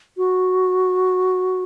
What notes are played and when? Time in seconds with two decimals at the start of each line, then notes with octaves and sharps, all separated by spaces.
0.17 F#4